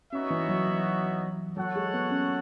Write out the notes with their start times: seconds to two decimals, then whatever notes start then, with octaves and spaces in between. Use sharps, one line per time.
0.12 B3 C#4 D#4 F#4 C#5 E5
0.30 E3
0.48 F#3
0.67 E3
1.56 F#3 F#4 A4 C#5 F#5
1.76 G#3
1.93 B3
2.11 C#4